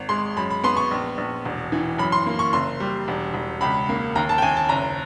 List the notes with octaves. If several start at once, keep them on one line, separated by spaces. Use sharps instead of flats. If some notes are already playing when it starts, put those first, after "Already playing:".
Already playing: G#1
G#3 C6
F#2 B5
B5
B3 C6
C#6
A#1
A#1
E1
E3
F#2 B5
C6
A#3
C#6
F#1 C6
G3
E1
E1
C#2 B5
A#3
D#2 A#5
A5
G5
D#2 G#5
A5
F#1 A#5